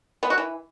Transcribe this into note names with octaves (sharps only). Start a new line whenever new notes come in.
B3
F#4
E3